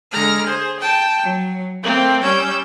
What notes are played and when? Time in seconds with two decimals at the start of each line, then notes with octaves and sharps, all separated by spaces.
0.11 D3 G#3 A#5 F6
0.46 G#4 C5
0.80 G5 A5
1.23 F#3
1.83 A3 A#3 C4
2.22 G3 C#4 E6 G6